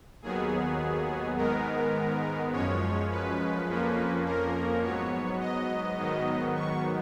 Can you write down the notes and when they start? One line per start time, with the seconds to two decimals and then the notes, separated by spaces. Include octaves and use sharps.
0.22 D#2 D#3 F#3 B3 G#4
1.37 G#2 D#3 G#3 B3 A#4
2.52 F#2 F3 G#3 C#4 C#5
3.10 B4
3.67 F2 F3 A#3 C#4
4.25 A#4
4.82 G#2 F#3 B3 C#5
5.40 D#5
5.98 G#2 D#3 F#3 B3
6.55 C#6